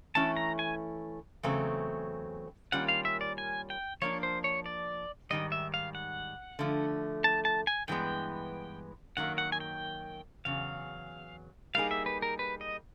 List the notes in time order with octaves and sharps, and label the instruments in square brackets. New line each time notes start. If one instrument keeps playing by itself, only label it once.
[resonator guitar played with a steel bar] E3 A3 C#4 E4 [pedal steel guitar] A5
[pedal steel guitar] A#5
G#5
[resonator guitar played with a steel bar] E2 C#3 F#3 A3 C4
[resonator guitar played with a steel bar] D#3 G3 A#3 C#4 F4 [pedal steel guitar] F#5
[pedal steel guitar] F5
E5
D5
G#5
G5
[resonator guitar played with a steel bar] F3 A#3 D4 [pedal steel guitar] C#5
[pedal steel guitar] C5
C#5
D5
[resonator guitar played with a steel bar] G#2 D#3 G3 [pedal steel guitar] D#5
[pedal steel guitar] E5
F5
F#5
[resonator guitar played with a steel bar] D3 F3 A3
[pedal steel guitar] A5
A5
G#5
[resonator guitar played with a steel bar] G2 E3 G#3 B3 [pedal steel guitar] G5
[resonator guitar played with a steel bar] F#2 D#3 F#3 A#3 [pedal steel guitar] F#5
[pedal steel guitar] F#5
G#5
G5
[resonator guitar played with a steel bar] E2 C#3 F#3 [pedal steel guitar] F5
[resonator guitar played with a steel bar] G3 A#3 D#4 G#4 [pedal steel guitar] F5
[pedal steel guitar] E5
B4
A#4
B4
D#5